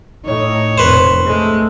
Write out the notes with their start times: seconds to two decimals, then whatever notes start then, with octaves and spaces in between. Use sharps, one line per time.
0.25 A2 D#4 C#5
0.78 F1 A#2 B4 C5
1.26 G#3 A3